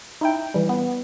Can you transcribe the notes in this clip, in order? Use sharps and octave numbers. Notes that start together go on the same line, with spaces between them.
D#4 E4 G5
E3 G3
B3